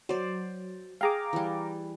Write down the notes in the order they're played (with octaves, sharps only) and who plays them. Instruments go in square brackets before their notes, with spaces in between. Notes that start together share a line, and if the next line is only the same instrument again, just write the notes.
[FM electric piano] F#3 [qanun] C5 D5
[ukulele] G#4 G5 [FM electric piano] F5 A#5 D6
[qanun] E3 G3